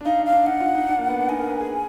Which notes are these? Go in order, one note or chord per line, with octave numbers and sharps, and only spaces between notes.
D4
D#4 F5
D4
F5
D4
D#4 F#5
F4
D#4
D4
A#3
B3
D4
D#4 G#5
A#4
B4
G#4